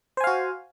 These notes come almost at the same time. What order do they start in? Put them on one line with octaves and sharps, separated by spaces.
C5 G#5 F5 F#4